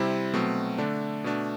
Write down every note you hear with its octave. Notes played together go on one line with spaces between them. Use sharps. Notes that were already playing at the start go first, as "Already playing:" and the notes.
Already playing: C3 G3 C4 E4
B2 F#3 A3 C4
D3 A3 D4
B2 A3 D4